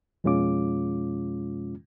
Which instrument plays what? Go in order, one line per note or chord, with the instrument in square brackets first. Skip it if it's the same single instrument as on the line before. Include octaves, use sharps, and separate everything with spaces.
[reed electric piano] F2 B2 G#3 C#4 F4 D6